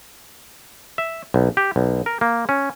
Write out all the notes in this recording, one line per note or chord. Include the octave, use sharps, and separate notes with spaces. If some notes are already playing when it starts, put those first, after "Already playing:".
E5
B1
G4
B1
A#4
A#3
C#4